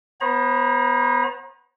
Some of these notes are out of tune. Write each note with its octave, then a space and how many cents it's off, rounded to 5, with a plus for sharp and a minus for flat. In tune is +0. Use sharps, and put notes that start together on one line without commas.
B3 +0 C5 +45 A#5 +30